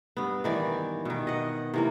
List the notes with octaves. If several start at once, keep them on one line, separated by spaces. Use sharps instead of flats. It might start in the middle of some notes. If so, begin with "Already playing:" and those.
G2 B3
D#3 E3 D5
B2 D#3
D#5 F#5
C3 E3 A#3